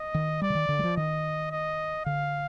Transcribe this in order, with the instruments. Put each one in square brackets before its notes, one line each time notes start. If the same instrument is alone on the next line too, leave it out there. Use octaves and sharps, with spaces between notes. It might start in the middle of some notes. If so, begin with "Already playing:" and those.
Already playing: [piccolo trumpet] D#5
[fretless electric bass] D#3
[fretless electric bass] G3 [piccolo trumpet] D5
[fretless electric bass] D3
D#3
D3
G3
F3
[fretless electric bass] D#3 [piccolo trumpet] D#5
[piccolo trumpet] D#5
[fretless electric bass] D3 [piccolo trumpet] F5